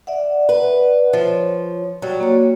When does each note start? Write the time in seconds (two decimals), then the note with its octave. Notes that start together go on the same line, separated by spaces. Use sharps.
0.07 D5 E5 F#5
0.49 B4
1.13 F3 C#5
2.02 F#3 G3
2.20 A#3 F#4 C#5